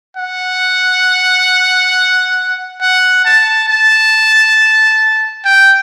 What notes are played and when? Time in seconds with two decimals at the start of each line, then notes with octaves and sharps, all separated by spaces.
0.17 F#5
2.81 F#5
3.25 A5
3.69 A5
5.45 G5